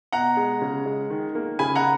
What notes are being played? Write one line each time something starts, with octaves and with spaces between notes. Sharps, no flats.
B2 F#5 A#5
G#3
C#3
G#3
D#3
A#3
C#3 G#5 B5
F#5 A#5